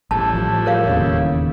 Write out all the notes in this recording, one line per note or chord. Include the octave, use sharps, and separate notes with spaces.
A1 A2 G3 E4 A5
F3
A#4 C#5 F5
E1 D#2 C#3